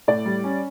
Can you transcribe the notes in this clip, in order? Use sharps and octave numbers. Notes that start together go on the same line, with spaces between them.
A2 D5
G3
C#4